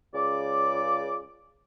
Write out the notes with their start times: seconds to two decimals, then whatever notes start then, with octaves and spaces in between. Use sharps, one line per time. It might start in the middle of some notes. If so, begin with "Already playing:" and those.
0.14 C#2 C#3 D5 D6